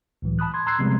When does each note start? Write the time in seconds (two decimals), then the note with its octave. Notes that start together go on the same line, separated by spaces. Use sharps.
0.22 C#2 A2 E3 F#3
0.39 A5 B5 D#6 F#6
0.54 C6 G#6
0.66 A#5 C6 E6 F#6 G#6 C7
0.79 C3 F3 G3 G#3 B3 C4